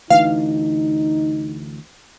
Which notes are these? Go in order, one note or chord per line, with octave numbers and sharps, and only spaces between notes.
D2 E3 D#4 F5